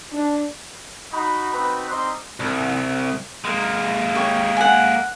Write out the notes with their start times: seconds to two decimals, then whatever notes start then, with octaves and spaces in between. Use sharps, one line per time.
0.12 D4
1.13 D#4 F#4 B5
1.53 C4 D#4 F#4 B4
1.90 G3 C4 D#4 C5 D#5 C6
2.40 C2
3.45 G#3 A#3
4.15 G4 C#5
4.57 F#5 G#5